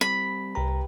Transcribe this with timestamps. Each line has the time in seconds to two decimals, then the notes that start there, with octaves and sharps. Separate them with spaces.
0.01 G3 C4 B5
0.55 C2 G4 B4 A#5